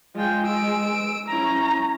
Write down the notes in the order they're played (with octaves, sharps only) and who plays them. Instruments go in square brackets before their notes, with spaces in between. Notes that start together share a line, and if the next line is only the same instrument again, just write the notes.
[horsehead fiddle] G#3 [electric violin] F4 G5
[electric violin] E6 D7
[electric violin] C#4 E4 [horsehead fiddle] A#5